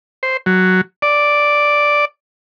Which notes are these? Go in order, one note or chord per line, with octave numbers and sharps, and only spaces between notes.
C5
F#3
D5